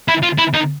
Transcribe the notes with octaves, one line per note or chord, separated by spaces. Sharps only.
E4
F4
E4
D#4